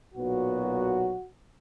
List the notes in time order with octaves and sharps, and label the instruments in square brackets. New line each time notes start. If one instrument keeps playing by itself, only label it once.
[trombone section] B1 A#2 F#3 B3 F#4